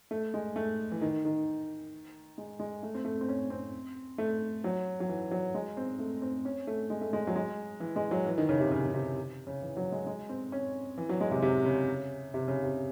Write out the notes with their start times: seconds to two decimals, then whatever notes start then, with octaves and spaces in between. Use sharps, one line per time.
0.11 A3
0.34 G#3
0.56 A3
0.91 E3
1.01 D#3
1.25 D#3
2.38 G#3
2.60 G#3
2.83 A3
2.94 C4
3.05 A3
3.21 C4
3.28 C#4
3.50 C4
4.18 A3
4.64 F#3
5.00 F#3
5.09 E3
5.31 F#3
5.54 G#3
5.77 C4
5.99 A3
6.22 C4
6.45 C#4
6.67 A3
6.90 G#3
7.01 A3
7.13 G#3
7.27 F#3
7.36 G#3
7.80 E3
7.96 G#3
8.11 F#3
8.26 E3
8.38 D#3
8.49 C#3
8.60 C3
8.72 C#3
8.85 C#3
8.94 C3
9.47 C#3
9.62 E3
9.77 F#3
9.92 G#3
10.07 G#3
10.29 C4
10.52 C#4
10.98 E3
11.09 F#3
11.21 G#3
11.31 C3
11.42 C3
11.65 C#3
12.34 C3
12.48 C#3
12.63 C3